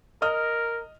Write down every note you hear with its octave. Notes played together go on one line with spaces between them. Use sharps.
A#4 D#5 D#6 F6